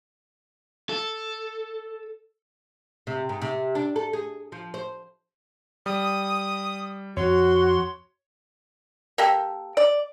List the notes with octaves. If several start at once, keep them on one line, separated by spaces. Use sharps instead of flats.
A4
C3
G#2
C3
D4
A4
G#4
F3
C5
G3 D#6
F2 F3 F#4 C#5 C6
A#3 G4 A4
D5